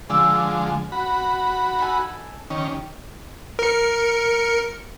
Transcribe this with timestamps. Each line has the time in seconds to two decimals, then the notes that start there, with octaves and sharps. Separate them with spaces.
0.10 D3 F3 G#3 C4 D6 E6
0.92 F#4 B5
1.79 D#4 A4 G#5
2.50 D#3 C#4 G4
3.59 A#4 C#7